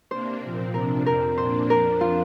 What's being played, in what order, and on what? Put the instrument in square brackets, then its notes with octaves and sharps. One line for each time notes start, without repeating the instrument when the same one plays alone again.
[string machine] C3 A#3 D4 [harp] C5
[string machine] A#2 F3 C4
[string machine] C3 F3 D4 [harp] A#4
[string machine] F2 F3 C4 [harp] A#4
[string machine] A#2 A#3 D4 [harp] C5
[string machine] F2 F3 D4 [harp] A#4
[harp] F4